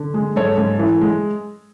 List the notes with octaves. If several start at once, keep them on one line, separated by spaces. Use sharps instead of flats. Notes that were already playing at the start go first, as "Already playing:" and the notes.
Already playing: D3
G#3
G#2 A4 C#5
G#2
E3
G#3